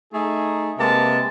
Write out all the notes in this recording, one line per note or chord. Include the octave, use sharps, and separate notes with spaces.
A3 D#4 G#4
C3 G#3 A#3 B4 A5